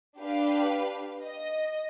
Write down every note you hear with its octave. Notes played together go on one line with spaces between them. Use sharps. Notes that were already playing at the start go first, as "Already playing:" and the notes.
D4 G4 B4 F5
D#5